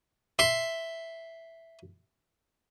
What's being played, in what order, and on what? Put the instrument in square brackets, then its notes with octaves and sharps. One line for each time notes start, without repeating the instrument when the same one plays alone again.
[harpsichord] E5 C6